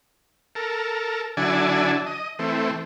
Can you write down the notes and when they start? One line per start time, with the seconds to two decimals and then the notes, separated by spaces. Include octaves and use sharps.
0.55 A4 A#4
1.37 D3 F#3 D4 E4 G#5 A5
2.06 D#5
2.39 E3 A3 C4